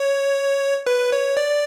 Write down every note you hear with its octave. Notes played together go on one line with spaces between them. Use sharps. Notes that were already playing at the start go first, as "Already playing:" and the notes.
Already playing: C#5
B4
C#5
D5